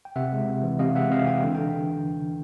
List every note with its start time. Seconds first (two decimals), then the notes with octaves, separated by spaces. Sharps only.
0.05 G5
0.16 C3 E5 F#5
0.33 G#3
0.48 C3
0.63 E3
0.79 C3 D#5 F5
0.95 G#3 E5 F#5
1.10 C3 D#5 F5
1.26 E3 G5
1.43 D3
1.55 D3 G5